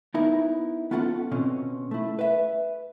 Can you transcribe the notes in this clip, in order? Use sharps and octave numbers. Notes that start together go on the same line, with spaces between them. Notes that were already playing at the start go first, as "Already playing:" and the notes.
B3 D#4 E4 A#4
B3 C#4 F4 A4 F5 F#5
B2 C4 C#4
A3 E4
B4 E5